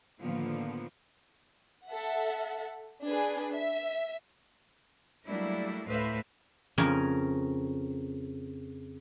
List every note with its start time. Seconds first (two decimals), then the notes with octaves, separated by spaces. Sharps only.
0.21 A2 D3 D#3 F3 A#3 B3
1.88 A4 E5 F#5
3.06 D4 G#4 B4 G#5
3.54 E5
5.26 F#3 G3 A3 A#3 D4 E4
5.86 D2 A2 B4 C5 E5 F5
6.78 F2 C#3 C#4 A#4